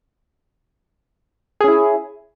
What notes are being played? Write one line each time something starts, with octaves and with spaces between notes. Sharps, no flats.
C#4 E4 G#4